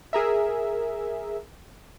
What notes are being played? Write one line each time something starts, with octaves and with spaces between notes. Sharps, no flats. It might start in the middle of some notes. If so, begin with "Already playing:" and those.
G#4 A#4 E5